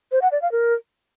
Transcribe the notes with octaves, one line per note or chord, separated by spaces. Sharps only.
C5
F#5
D5
F5
A#4